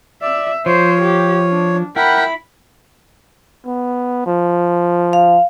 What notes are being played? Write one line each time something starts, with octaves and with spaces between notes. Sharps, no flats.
D5 E5
F3 C5 C#5
G4
D4
E4 A#4 F#5 G5 B5
B3
F3
F5